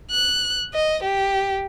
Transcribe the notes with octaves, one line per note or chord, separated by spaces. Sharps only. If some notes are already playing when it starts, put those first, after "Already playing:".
F#6
D#5
G4